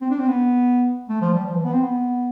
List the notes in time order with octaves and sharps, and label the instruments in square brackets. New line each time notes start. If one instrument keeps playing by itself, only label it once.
[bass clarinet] C4
D4
C4
B3
A3
F3
G3
F3
E3
B3
C4
B3